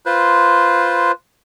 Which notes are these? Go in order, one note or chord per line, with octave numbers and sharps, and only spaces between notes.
F4 B4 C5